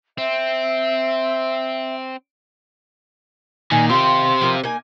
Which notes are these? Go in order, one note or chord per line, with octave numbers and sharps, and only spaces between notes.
C4 E5
A#2 D#3 A#3 A#4 G#5
D#3 C4 F4 G4 C6
F3 F4 A#4
A#3 D#4 G#5